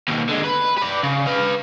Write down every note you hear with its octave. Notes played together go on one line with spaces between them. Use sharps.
D#2 B2
D3 G#3
B4
B4 D5
C#3
B4 F5